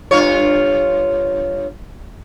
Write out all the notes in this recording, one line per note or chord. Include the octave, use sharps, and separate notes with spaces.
G2 F4 C#5